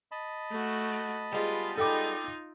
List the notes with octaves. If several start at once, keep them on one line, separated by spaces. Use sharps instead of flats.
D#5 A5 B5
A3 F#4
G3 G#3 B3 F4
D#4 F4 A4 G5 D6